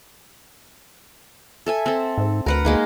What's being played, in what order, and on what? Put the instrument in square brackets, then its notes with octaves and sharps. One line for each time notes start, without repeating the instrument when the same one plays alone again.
[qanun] A4 E5 G#5
C4 A4
[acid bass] G#2
[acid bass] D2 [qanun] A#4 B4 F#5
[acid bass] D2 [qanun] G#3 A#3 D#4